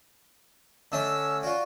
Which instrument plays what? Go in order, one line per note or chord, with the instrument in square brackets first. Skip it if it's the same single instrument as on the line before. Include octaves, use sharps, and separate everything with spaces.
[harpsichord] D3 A3 D#5 [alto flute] C#4 [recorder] E6
[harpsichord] F4 F#4 [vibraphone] D5 C#6